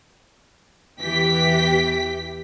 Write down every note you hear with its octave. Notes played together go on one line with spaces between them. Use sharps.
E2 E3 G4 G5 B6